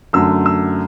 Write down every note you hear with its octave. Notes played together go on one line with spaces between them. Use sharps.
F#2 D3 F#3 A3 E6
E6